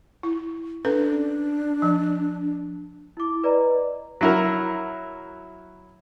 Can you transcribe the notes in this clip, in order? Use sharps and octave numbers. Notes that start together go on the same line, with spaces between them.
E4
C#4 D4 A4 B4
F3
E4 D6
B4 D5 D#5 A#5
F#3 E4 A#4